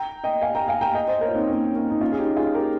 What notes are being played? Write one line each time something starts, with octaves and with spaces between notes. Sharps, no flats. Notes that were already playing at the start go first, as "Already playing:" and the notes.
Already playing: G5 A#5
D#5 G5
F5 G#5
G5 A#5
F5 G#5
G5 A#5
D#5 G5
C5 D#5
A#4 C#5
F4
C4 D#4
A#3 C#4
A#3 C#4
D#4
C#4 F4
G#4
D#4 G4
F4 G#4
G4 A#4